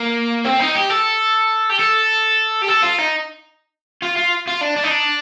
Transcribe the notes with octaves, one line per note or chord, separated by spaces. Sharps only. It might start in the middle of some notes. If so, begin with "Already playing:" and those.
Already playing: A#3
C4
D#4
G4
A4
G4
A4
G4
A4
F4
D#4
F4
F4
F4
D4
D4
D#4
D4